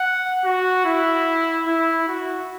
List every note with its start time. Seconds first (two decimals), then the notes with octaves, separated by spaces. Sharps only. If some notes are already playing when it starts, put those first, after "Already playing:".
Already playing: F#5
0.45 F#4
0.85 E4
1.67 E4
2.08 F#4